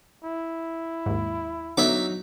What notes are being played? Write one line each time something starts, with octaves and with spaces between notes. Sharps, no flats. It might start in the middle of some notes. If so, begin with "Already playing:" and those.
E4
D#2 G#2
D3 F#3 B3 D#4 C#5 E5 D6